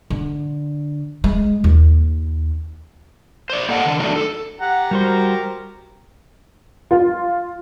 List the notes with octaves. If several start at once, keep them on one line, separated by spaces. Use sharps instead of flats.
D3
G#3
D#2
C5 D5
A#3 A4 D#5 F#5 G5 A5
D#3 D4
F#3 A3 D4 D#4
A4
G4 F#5 A#5
G3 F#4 A#4 C5
F4